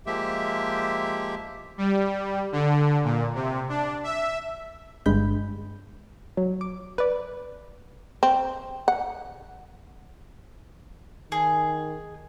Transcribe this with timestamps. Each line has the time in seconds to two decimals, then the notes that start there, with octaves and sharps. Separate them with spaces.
0.06 F3 G#3 A#3 G4 E5
1.78 G3
2.52 D3
3.04 A#2
3.35 C3
3.69 D4
4.04 E5
5.06 G1 G2 G#3 B5 G6
6.37 F#3
6.61 D6
6.98 B4 D5
8.23 C4
8.88 F#5
11.32 D#3 G#4